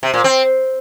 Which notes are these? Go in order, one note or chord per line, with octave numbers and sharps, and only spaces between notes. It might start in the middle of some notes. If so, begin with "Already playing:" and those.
C3
A#2
C4